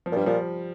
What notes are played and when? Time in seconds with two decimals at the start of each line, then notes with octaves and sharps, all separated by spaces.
0.06 F3
0.12 A#2
0.16 G2 G3
0.26 A#2 F3